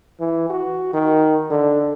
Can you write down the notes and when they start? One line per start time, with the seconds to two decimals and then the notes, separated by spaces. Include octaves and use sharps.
0.19 E3
0.49 F#4
0.94 D#3
1.51 D3